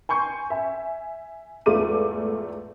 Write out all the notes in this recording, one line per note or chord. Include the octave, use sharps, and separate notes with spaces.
G#5 C6 C#6 G6
E5 G#5
E2 G#2 A3 F4 D6 D#7